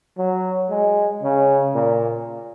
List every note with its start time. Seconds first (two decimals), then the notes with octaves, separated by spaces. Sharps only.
0.18 F#3
0.70 G#3
1.23 C#3
1.75 A#2